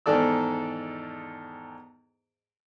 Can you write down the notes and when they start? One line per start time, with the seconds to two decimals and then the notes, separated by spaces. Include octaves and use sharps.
0.06 E2 G#2 D#3 A4 D5 E6